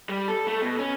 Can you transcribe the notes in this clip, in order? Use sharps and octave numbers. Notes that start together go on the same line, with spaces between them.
G3
A4
A3
B2
C#4